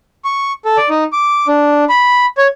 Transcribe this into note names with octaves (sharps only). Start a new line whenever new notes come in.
C#6
A4
D5
D#4
D6
D4
B5
C#5